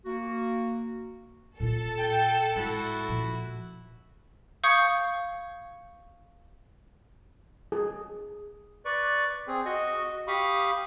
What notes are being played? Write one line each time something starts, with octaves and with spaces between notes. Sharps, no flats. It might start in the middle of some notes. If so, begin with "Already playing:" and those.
A#3 F#4
A#2 F4 A4
G5
A2 G#3 E4 F#4
A#2 F3
F5 C#6 D#6 G6 G#6 C#7
G#4
B4 D5 C#6
C4 G#4
F#4 D#5 C#6
G4 F5 B5 C#6 D#6